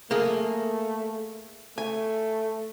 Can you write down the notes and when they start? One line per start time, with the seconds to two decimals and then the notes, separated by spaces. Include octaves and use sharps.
0.11 A3 A#3 G#4
1.78 A3 G#5